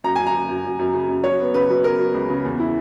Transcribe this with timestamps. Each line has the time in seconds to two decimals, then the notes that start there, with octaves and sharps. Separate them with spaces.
0.04 F#2 A#5
0.16 F#2 G#5
0.27 A#5
0.34 F#2
0.49 F#2
0.65 F#2
0.79 F#2
0.94 C#3
1.09 F#2
1.24 F#3 C#5
1.39 B3
1.54 C#3 B4
1.70 F#3
1.84 B3 A#4
1.99 F#3
2.14 C#2
2.30 C#3
2.45 E2
2.60 E4